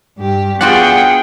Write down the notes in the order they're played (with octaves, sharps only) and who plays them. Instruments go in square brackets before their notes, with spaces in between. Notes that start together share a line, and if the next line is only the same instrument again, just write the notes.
[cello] G2 G4
[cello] B3 G#4 [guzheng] D4 F4 F#4 [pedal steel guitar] F#5 [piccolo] G5